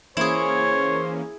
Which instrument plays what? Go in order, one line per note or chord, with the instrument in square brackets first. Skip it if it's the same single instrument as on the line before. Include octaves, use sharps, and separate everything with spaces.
[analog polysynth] E3 A#3 C#4 [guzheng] E4 G#4 [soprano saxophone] C5 [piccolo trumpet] C#5